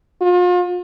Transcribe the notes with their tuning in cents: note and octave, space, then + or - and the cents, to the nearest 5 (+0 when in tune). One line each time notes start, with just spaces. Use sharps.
F4 +40